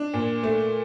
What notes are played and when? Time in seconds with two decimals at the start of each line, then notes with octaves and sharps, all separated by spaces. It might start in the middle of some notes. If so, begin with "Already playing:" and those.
Already playing: D4
0.14 A#2
0.43 A3